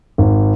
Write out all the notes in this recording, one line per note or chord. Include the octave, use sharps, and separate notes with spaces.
G#1